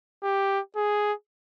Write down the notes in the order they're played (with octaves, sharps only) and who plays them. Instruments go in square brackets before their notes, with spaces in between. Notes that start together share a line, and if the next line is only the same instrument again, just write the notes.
[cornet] G4
G#4